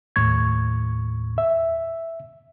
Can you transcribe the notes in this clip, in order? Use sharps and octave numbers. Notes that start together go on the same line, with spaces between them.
D#2 A2 C#6 G#6
E5